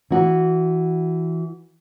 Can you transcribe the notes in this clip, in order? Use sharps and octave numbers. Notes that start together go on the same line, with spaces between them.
E3 F#4